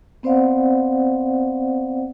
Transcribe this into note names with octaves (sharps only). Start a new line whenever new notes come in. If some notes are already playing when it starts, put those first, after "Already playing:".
B3 C4 C5 D5 F5 F#5